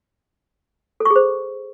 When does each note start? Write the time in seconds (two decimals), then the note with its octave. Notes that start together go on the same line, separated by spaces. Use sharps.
1.00 A4
1.05 C#6
1.11 G#4
1.16 C5